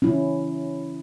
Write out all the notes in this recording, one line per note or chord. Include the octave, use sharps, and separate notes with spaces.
C#4 E4